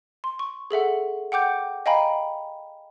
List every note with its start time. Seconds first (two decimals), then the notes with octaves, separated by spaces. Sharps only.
0.24 C6
0.39 C#6
0.71 G#4 A4 E5 F#5
1.32 F#5 G5 D6 G6
1.86 D#5 F5 G5 G#5 A#5 B5